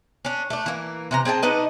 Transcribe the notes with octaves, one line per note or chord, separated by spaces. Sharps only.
C#4 D4
A3 D4
E3 A#3
C3 E3 A#5
C4 G#4 G5 A5
D4 D#4 B4 D#5